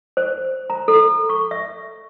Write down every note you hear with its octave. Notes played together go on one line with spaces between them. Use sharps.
C5
A#5
A4
C#6
E5